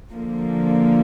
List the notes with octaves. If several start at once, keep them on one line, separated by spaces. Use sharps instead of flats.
D3 F3 A#3